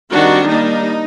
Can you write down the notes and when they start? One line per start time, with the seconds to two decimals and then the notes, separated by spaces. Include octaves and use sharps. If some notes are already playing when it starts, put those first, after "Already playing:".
0.11 D#3 G3 C4 D4 F#4
0.48 G3 A#3 D4 D#4